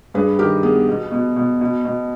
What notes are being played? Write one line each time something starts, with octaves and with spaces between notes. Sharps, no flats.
G2 G#4 B4
D#3 G4 A#4
B3 G#4
B2
B2
B2
B2
B2